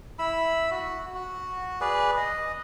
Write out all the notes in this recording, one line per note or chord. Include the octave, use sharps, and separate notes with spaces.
E4 B5 E6
F#4
F#4
G#4 B4 D5
D#5